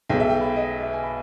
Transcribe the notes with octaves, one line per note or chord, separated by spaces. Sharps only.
B1 B2 G#3 G5
E5
G5
B5
D#5
E5
G#5
B5